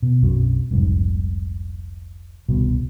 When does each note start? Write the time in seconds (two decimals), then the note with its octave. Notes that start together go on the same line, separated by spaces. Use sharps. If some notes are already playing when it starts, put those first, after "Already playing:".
0.02 B2
0.22 B1 F#2 F#3 C4
0.71 F1 C2 G#2
2.49 D#1 C2 B2